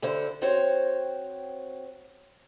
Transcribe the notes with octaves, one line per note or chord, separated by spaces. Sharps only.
D2 D3 E4 C5
C4 F#4 C5 C#5 G5